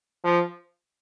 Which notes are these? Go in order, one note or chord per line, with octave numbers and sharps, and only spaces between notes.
F3